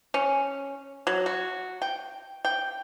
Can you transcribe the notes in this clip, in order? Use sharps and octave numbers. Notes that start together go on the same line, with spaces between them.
C#4
F#3
F#4
G5
G5